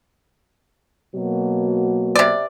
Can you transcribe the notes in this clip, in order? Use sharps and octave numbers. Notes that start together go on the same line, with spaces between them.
B2 F#3 A#3
C3 D5